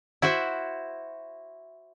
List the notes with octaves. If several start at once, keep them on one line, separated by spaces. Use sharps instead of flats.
E4 F#4 C5 E5